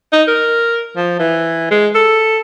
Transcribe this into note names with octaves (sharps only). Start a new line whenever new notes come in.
D#4
A#4
F3
E3
G#3
A4